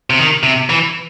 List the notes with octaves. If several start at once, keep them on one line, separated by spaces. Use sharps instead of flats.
C3
D#3
C3
E3